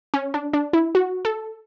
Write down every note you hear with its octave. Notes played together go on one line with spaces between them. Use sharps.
C#4
D4
D4
E4
F#4
A4